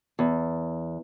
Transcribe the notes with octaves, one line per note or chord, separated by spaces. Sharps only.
E2